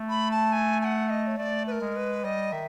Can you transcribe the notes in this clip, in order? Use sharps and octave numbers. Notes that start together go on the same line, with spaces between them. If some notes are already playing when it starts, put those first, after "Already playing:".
Already playing: A3
B5
A5
G#5
G#5
F#5
D#5
C#5
A3 D5
B4
A#4
G#3
B4
G3 D#5
D#3 E5